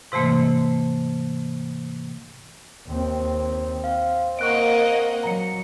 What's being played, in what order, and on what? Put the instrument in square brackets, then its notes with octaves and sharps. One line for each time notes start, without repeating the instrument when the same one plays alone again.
[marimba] G#2 C3 E3 A3 A#3
[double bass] D#2 C4
[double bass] C4 [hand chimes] F5
[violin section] A#3 D#5 F#5 [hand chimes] C#6 F#6 D7
[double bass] F#3 [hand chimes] A#5 C#7